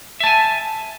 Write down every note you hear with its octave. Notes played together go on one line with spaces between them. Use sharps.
E5 G#5 A5